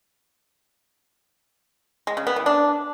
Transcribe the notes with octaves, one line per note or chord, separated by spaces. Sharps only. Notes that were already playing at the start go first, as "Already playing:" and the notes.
G#3
C#3
B3
E3
D4